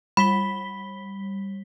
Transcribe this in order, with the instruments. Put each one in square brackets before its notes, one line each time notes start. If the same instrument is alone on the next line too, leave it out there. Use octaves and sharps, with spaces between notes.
[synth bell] G3 B6 G7 [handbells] B5